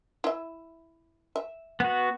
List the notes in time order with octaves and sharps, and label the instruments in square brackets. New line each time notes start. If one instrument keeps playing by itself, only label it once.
[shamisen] E4 E5
E5
[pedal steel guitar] B3 F#4